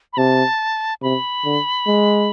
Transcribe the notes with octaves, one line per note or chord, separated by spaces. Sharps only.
B5
C3 A5
C3 B5
D3
G#3